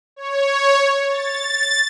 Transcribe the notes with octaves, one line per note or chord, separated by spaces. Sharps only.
C#5
A6